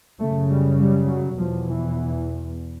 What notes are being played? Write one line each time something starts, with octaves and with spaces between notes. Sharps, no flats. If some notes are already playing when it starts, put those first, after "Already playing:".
F#2 C#3 A3
G3
G3
F#3
E2 B2 F3
E3